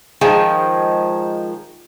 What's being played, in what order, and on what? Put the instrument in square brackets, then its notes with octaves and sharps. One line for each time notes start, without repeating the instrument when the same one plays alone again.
[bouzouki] D#3 F3 G#3 [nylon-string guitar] D#4 G#4